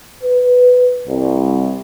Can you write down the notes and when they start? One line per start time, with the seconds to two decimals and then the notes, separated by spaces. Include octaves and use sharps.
0.23 B4
1.07 C2